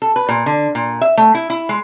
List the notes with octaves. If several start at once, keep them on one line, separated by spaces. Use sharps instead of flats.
A4
B4
A#2
D3
A#2
E5
A3
E4
E4
G#3